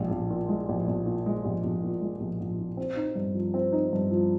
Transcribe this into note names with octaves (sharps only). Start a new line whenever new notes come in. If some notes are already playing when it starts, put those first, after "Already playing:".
Already playing: A#1 G#3
A#1
A#2
G#3
A#1
A#1
A#2
G#3
A#1
A#1
A#2
G#3
A#1
A#1
A#2
C4
D#4
G2
F3
C4
D#4
G2
F3